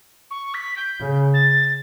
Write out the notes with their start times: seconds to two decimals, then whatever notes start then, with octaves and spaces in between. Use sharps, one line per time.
0.31 C#6
0.54 B6
0.77 G6
1.00 C#3
1.34 A6